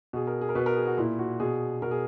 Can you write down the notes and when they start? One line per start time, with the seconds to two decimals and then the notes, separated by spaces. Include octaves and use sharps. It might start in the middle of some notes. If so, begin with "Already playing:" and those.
0.13 B2 G#4
0.27 A#4
0.41 G#4
0.49 A#4
0.55 B2 B4
0.66 A#4
0.76 G#4
0.87 F#4
0.98 A#2 E4
1.19 F#4
1.40 B2 G#4
1.82 B2 A#4
1.91 G#4